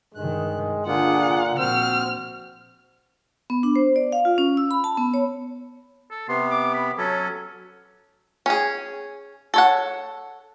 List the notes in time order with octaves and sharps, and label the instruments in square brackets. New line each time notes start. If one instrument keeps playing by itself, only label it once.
[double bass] G2 D#3 [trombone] G#3 [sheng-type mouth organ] F#6
[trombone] A#2 [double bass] D3 [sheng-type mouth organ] D4 F4 G#4 [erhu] F#5
[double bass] A#1 [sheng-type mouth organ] C4 C5 [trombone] F#4 [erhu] F6
[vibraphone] B3
D4
C5
D5
F5
F4
C#4
E6
B5
A5
B3
C#5
[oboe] A4
[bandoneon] C3 B3 [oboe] C6
[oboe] D6
B5
[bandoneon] F#3 A4 [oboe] C#4
[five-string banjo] C#4 G#4
A4 C#5 F#5